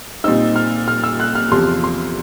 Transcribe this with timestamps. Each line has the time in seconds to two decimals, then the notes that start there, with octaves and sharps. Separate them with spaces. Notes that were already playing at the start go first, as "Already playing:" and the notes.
0.24 A#2 G3 C4 D#4 E6
0.56 F6
0.88 F6
1.04 E6
1.20 F#6
1.35 F6
1.51 E2 C3 F3 C6
1.84 C6